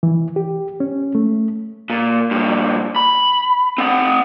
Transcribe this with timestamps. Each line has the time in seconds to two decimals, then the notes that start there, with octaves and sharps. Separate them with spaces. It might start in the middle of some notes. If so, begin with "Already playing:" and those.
0.03 E3
0.36 G4
0.80 C#4
1.15 A3
1.90 A#2
2.31 G2 A#2
2.96 B5
3.78 C4 F#5